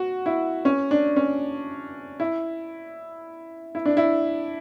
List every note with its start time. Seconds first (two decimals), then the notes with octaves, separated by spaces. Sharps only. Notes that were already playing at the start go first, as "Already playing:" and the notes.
Already playing: F#4
0.26 E4
0.65 C#4
0.91 D4
1.16 C#4
2.20 E4
3.75 E4
3.85 D4
3.97 E4